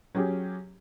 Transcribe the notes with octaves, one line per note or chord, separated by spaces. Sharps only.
F#3 C#4 G4 G#4